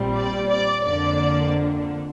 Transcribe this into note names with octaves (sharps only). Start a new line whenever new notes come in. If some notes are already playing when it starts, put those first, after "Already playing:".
Already playing: A#1 A#2 G3 C4
D5
D5
F2 D3 A#3 D4 D5